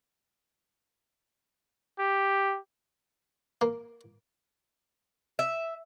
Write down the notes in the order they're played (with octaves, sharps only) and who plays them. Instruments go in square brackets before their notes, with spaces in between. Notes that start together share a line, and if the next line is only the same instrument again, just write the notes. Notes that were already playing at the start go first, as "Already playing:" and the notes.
[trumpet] G4
[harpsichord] A#3
[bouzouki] E5